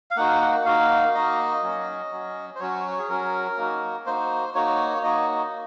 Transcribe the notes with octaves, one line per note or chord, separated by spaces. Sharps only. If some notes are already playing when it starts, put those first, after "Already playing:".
F5
A#3 D#4 F#4 F#5
F#5
A#3 D#4 F#4 F5
A#3 D#4 F#4 D#5
F#3 C#4 F#4
F#3 C#4 F#4
C5
F#3 C#4 F#4 C#5
F#4
G#4
F#3 C#4 F#4 A#4
A#3 D#4 F#4
A#3 D#4 F#4 C5
A#3 D#4 F#4 C#5
A#3 D#4 F#4 D#5